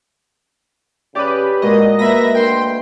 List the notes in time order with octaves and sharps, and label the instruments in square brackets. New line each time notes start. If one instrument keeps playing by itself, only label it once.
[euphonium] C#3 [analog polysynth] G4 B4 [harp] D5 D6 D#6
[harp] A#2 G#3 F#4 [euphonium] A#4 [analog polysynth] D#5
[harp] A#3 B4 D#5 [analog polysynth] E5 B5 A#6
[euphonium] D2 [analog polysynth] G5 C6